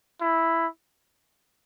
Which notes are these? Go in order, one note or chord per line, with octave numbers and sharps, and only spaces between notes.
E4